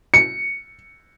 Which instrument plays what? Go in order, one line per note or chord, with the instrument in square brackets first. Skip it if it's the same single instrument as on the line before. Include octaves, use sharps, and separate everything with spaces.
[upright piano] C#7